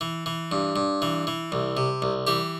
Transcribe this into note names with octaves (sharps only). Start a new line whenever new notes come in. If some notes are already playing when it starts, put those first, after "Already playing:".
E3
E3
G2
G2
E3
E3
C2
C3
C2
E3 G4